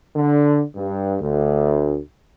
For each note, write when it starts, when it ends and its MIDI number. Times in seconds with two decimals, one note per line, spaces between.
0.15 0.61 50
0.75 1.15 43
1.21 1.97 38